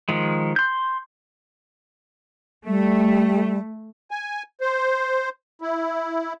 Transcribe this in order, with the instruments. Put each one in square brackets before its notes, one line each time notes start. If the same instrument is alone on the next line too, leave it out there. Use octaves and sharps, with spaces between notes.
[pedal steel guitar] D#3 F3 G#3
C6 G6
[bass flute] G3 [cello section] A3
[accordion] G#5
C5
E4